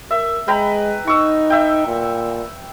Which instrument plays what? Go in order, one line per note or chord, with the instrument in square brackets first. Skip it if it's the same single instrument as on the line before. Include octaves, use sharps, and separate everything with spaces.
[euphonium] A#4 [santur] E5
[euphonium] G#3 [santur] B4 G5 A#5
[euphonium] D#4 [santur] C#6 E6
[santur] E5 G5
[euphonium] A#2